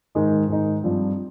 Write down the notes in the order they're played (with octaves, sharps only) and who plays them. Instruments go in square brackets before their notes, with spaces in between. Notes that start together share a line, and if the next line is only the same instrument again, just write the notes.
[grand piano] G#2 D#3 G#3 D#4
G#2 D#3 G#3 D#4
G2 F3 C4